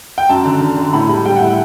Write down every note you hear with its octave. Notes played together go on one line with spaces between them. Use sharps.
G5
F#2 A5
D3
D3
D3
A2 B5
G3 B5
G3 G5
F#5
A2 E5